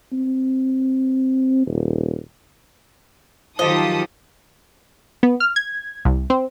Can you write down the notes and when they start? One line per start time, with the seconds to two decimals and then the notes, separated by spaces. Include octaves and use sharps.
0.13 C4
1.67 D#1
3.59 D#3 F3 F#3 F4 G4 A4 D#5 D#6
5.23 B3
5.40 F6
5.56 G#6
6.05 C2
6.30 C4